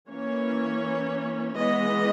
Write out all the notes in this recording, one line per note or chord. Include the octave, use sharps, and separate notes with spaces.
E3 A#3 C#4 C#5
E3 G#3 B3 D#5